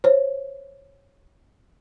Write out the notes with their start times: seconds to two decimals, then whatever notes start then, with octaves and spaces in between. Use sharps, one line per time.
0.04 C5 C#5